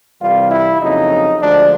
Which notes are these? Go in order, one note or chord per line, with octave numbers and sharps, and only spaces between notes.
C2 C3 E3 G3 F4
E4
F2 C#3 F#3 A#3 D#4
D2 D3 F3 G#3 D4